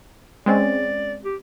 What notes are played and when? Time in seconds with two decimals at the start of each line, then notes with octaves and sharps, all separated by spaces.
0.46 G#3 C4 C#4 D5
1.25 G4